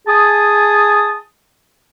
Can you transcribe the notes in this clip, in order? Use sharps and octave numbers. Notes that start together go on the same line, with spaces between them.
G#4 G#5 A5 D#6